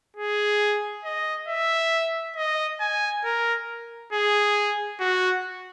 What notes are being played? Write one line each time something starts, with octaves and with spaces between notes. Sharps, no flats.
G#4
D#5
E5
D#5
G#5
A#4
G#4
F#4